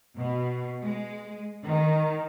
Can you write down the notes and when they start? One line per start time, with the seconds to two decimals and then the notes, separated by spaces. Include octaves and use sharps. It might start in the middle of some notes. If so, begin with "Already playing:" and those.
0.17 B2
0.82 G#3
1.65 D#3